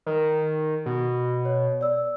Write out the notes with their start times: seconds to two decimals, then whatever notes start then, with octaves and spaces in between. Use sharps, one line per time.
0.06 D#3
0.86 B2
1.45 C#5
1.81 D5 E6